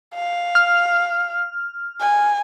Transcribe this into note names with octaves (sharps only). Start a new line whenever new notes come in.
F5
F6
G#5